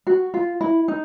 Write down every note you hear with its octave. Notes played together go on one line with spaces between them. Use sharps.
F#4
F4
E4
D#4